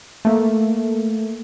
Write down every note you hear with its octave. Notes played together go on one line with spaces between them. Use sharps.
A3 A#3